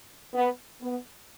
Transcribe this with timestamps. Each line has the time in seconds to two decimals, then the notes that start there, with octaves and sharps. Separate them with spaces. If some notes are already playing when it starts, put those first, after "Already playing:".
0.33 B3
0.81 B3